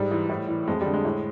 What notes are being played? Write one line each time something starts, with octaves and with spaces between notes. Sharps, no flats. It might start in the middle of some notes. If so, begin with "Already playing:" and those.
Already playing: G#2 G3
E3
A2
E3
F2 G#3
D3 G3
G#3
A2